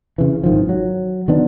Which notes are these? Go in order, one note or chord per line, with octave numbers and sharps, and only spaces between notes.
C#3 E3
G#1 D#3 F3
F#3
D#3 F#3 B3 D4